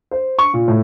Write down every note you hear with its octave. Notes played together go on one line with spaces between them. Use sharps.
C5
C#6
A#2
A2